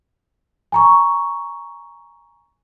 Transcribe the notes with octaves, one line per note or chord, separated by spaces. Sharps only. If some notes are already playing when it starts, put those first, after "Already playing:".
G#5 A#5 C#6